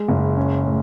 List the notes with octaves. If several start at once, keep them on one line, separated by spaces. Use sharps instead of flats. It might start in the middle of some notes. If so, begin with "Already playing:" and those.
Already playing: G#3
F#1
C#4
A2